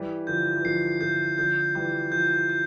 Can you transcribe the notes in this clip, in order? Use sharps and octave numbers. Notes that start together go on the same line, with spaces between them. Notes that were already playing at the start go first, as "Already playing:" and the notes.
Already playing: E3 G3
D3 F3 G6
E3
D3 F3 C7
D3 F3 G6
D3 F3 G6
E3 G3 G6
D3 F3 G6
G6